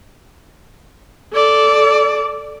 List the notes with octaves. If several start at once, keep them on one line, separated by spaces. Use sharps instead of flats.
A4 D5